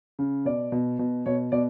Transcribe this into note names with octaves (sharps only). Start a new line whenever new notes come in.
C#3
B2 D5
B2
B2
B2 C#5
B2 D5